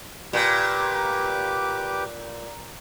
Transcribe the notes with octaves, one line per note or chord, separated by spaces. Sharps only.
A#2 G4 B4 D6